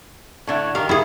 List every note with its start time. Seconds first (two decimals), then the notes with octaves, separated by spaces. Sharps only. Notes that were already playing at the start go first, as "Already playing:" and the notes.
0.47 A2 D3 E4
0.75 D#3 G4 F5
0.89 E4 G#4